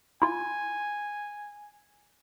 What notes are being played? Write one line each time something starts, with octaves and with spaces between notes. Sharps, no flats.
E4 F4 G#5